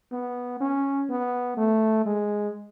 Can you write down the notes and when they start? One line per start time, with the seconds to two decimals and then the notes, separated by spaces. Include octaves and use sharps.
0.13 B3
0.61 C#4
1.10 B3
1.57 A3
2.06 G#3